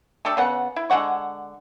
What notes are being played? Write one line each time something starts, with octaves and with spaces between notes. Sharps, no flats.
A3 D4 G4 A4
C#3 B3 F#5
E4
D3 G#3 F#5 C#6